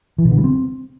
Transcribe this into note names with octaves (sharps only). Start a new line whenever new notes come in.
E3
B2
D3
G3
C4